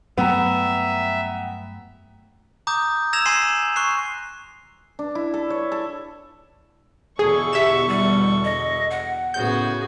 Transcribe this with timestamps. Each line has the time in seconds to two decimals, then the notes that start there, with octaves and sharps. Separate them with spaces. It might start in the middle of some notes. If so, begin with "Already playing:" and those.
0.18 G2 F#3 A3 B3 E5 F#5 G5 A#5
2.67 A#5 D6 D#6 G6
3.13 E6 G#6 A#6 E7 F7
3.25 G#5 C6 C7 D#7 E7
3.76 C#6 F#6 C7
4.99 D4
5.15 E4
5.34 A4
5.50 C#5
5.72 A4
7.19 E2 B2 D3 G#4 A4 C#6
7.53 G4 E5 E7
7.88 G3
8.44 D#5
8.91 F#5
9.34 A2 C#3 B3 F#4 G#4 G6